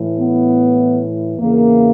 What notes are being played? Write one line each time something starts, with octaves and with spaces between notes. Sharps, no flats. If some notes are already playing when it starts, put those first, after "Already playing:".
Already playing: A2 E3
B3
E2 C#3 E3 A#3